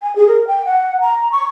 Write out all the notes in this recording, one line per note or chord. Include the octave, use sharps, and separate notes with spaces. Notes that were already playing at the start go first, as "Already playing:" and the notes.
G#5
G#4
A#4
G5
F#5
A#5
C#6